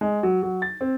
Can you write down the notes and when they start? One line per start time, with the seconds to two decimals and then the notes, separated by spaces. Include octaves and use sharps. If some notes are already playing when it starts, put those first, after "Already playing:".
0.01 G#3
0.23 F#3
0.42 F#3
0.62 A6
0.81 C4